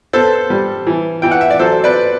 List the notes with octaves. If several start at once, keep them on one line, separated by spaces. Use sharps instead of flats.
B3 A4 C5
G3
E3
E3 G5
F#5
E5
D5
F#3 A4 C5
B4 D5